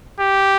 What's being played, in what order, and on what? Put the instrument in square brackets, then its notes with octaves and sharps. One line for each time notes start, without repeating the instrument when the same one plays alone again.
[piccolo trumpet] G4